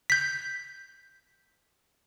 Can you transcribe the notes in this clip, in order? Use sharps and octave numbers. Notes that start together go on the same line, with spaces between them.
G6 B6